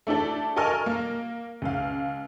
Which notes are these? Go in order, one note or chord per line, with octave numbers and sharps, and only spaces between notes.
A3 D4 E4 A4
A4 A#4 D#5 G#5 C#6 F6
A#3
C#2 F5